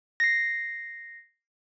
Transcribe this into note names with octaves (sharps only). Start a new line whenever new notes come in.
A#6 C7